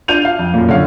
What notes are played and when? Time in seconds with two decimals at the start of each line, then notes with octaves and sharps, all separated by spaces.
0.08 D4 F4 G6 D#7 F7
0.25 F5
0.39 F2
0.54 F#2 A#2
0.69 D3 C#4 F5